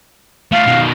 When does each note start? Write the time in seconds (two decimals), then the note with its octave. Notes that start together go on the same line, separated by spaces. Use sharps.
0.52 A3 F4 F5
0.66 B2 D#3